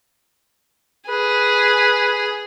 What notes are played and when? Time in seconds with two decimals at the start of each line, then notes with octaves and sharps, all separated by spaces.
1.09 G#4 B4